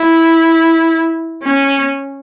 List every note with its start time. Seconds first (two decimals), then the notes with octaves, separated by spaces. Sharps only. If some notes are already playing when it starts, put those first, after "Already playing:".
Already playing: E4
1.43 C#4